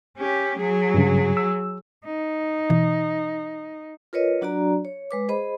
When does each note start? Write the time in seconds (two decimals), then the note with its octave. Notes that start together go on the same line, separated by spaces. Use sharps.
0.17 C#4 G4
0.59 F#3 G#4
0.94 G2 C#3
1.37 E6
2.05 D#4
2.70 B2 E3
4.13 F4 A#4 B4 C#5 D#5
4.41 F#3 D4 F#4 D5 A#5
4.85 C#5
5.11 G#3 B4 D6
5.29 G#4 C5 D#5 B5